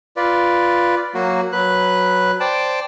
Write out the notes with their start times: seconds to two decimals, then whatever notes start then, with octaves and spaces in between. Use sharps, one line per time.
0.17 F4 B4 D5
1.15 F#3 A#3 F#4
1.52 F#3 B4 F#6
2.40 C5 D5 G5 A5